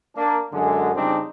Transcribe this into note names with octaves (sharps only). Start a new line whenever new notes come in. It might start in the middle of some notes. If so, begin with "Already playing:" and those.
A#3 D4
F#2 D3 G#3
F2 C#3 G3 C4 D4 D#4